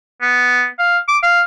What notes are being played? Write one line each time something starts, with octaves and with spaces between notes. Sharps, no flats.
B3
F5
D6
F5